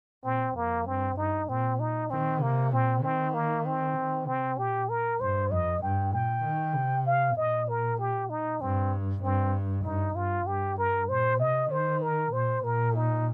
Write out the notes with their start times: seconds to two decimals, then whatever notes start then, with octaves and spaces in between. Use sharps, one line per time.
0.24 A#2 C4
0.56 F2 A#3
0.86 G2 C4
1.17 G2 D#4
1.49 A#2 C4
1.80 D#4
2.10 D#3 C4
2.41 C3 A#3
2.72 A#2 C4
3.03 D#3 C4
3.34 A#3
3.65 C4
3.97 D#3
4.27 C3 C4
4.58 A#2 G4
4.89 A#4
5.20 G2 C5
5.51 F2 D#5
5.82 G2 G5
6.13 A#2 G5
6.44 D#3
6.74 C3
7.06 F5
7.37 A#2 D#5
7.69 A#4
7.99 G4
8.30 D#4
8.61 G2 C4
9.23 G2 C4
9.84 G2 D#4
10.16 G2 F4
10.46 G2 G4
10.78 A#4
11.08 A#2 C5
11.39 C3 D#5
11.71 D#3 C5
12.02 A#4
12.32 A#2 C5
12.64 A#2 A#4
12.95 D#4